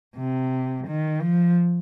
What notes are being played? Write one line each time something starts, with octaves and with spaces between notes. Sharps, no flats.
C3
D#3
F3